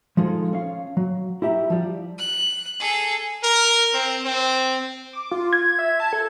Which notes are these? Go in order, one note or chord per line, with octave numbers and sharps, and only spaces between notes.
F3 G#3 D#4 F4 A4
C#4 F5
F#3
E4 G4 E5 A#5
F3 G3
F#6
G#4 A4
A#4
C4
C4
D6
F4
G#6
E5
A5
A4